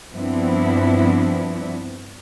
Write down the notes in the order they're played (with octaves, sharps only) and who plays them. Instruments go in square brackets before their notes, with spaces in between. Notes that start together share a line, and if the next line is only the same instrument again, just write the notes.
[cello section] G2 F3 B3 C4 D4 E4